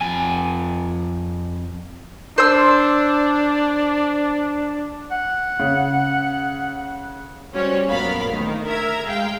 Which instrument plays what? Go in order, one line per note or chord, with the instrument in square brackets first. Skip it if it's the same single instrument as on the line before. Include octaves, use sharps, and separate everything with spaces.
[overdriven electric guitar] F2 G#5
[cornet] D4 [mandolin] C5 E6
[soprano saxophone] F#5
[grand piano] C#3
[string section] G3 C#4 F#4 G4 C5 C#5
A#1 F#2 B3 A#4 F5 B5
D2 D#3
A#4 E5 A#5 G#6
G#3 F5 G5